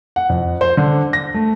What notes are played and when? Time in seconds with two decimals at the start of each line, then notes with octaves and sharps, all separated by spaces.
0.16 F#5
0.29 F2
0.61 C5
0.77 D3
1.13 A#6
1.34 A3